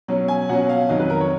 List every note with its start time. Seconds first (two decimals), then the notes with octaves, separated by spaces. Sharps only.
0.08 B2 F#3 C#4
0.28 G#5
0.49 B2 F#3 C#4 F#5
0.69 F5
0.89 F2 D#3 F#3 D#5
1.00 B4
1.10 A#4
1.20 C#5